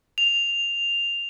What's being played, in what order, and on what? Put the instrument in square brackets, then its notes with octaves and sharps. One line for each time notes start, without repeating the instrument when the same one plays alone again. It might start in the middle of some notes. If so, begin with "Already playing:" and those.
[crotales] F7